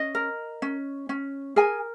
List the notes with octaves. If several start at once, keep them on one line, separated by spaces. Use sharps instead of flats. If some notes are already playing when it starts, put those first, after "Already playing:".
Already playing: C#4 D#5
A#4
C#4
C#4
G#4 A#4 G#5